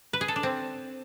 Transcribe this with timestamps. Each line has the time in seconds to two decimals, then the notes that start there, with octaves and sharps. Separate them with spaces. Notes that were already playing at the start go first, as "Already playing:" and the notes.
0.13 B4
0.21 G#4
0.28 A4
0.36 D4
0.43 C4